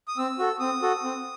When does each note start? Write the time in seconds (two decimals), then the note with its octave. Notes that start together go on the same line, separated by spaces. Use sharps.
0.08 D#6
0.18 C4 E6
0.39 F#4 A4
0.60 C4 D#6
0.82 F#4 A4
1.03 C4